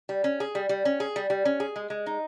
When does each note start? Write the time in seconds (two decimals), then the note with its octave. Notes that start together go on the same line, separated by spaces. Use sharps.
0.09 G3
0.24 C#4
0.40 G#4
0.55 G3
0.69 G3
0.85 C#4
1.00 G#4
1.16 G3
1.30 G3
1.45 C#4
1.60 G#4
1.76 G#3
1.90 G#3
2.06 D#4